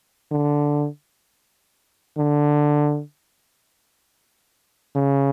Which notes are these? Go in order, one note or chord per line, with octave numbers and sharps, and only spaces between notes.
D3
D3
C#3